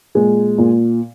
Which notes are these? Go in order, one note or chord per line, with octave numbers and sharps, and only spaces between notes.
A#2 G#3
A#2